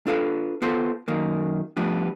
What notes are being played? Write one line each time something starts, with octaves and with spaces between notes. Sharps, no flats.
D4 F4 A4 B4 F5
B3 F4 A4 C5
F#2 D#3 A#3
F3 G3 A3 B3 D4